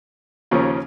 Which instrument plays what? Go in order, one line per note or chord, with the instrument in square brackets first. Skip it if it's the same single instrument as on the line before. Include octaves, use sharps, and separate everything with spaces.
[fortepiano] D#2 C#3 F3 A#3 C#4